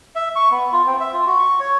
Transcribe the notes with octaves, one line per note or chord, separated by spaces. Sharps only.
E5
C#6
B3
F4
C4
E5
F4
F#4
C#6
C#5